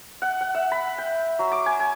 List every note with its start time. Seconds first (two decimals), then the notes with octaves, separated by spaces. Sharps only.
0.22 F#5
0.41 F#5
0.55 E5
0.72 B5
0.98 G5
1.39 F#3
1.52 D6
1.66 G#5
1.80 G#5